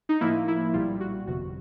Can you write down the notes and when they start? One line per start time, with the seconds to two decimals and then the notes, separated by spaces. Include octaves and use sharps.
0.09 D#4
0.21 A2 F3 A#3 E4
0.48 E4
0.74 B1 A#2 G3 F4
1.01 F#4
1.27 G1 F2 C3 F#4